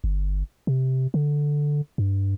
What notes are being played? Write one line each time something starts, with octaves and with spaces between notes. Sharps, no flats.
G1
C3
D3
G2